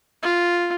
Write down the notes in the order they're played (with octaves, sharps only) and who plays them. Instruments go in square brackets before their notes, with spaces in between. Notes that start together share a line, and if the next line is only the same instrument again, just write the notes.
[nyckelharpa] F4